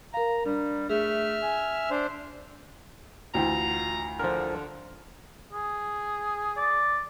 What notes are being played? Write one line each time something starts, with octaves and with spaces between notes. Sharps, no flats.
A#4 F5 A#5
G3 D4
A3 G#4 E5 F6
G#5
D4 C5
D2 E3 F4 G5 A#5
D3 F3 A#4
G#4
D5